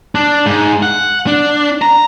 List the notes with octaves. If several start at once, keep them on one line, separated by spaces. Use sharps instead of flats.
D4
G#2
F#5
D4
A#5